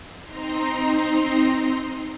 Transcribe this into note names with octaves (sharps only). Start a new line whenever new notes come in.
C4 D#4 A#5 C6